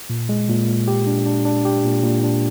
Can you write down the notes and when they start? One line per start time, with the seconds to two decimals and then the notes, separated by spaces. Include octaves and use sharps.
0.10 A#2
0.29 G#3
0.49 A#2
0.68 A#2
0.88 G4
1.07 D4
1.26 D4
1.45 D4
1.65 G4
1.84 A#2
2.03 A#2
2.23 D4